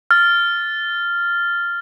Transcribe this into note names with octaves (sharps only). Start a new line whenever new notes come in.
F6 A6